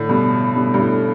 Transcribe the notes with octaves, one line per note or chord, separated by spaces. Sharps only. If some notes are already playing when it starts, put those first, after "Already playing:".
Already playing: A2 D3
G2 B2
G2 B2
G2
A2